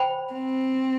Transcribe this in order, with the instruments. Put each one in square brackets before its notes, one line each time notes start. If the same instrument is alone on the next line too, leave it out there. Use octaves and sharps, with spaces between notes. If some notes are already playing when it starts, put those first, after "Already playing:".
Already playing: [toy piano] C5 G5 B5
[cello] C4